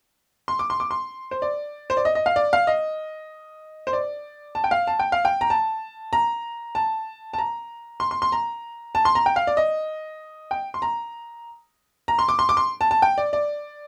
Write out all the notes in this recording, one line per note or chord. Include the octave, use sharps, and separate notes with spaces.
C6
D6
C6
D6
C6
C5
D5
C5
D5
D#5
D#5
F5
D5
F5
D#5
C5
D5
A5
G5
F5
A5
G5
F5
G5
A#5
A5
A#5
A5
A5
A#5
C6
C6
C6
A#5
A5
C6
A#5
G5
F5
D5
D#5
G5
C6
A#5
A#5
C6
D6
C6
D6
C6
A5
A5
G5
D5
D5